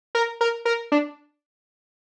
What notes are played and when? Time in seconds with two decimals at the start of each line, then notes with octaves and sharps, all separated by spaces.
0.15 A#4
0.41 A#4
0.65 A#4
0.92 D4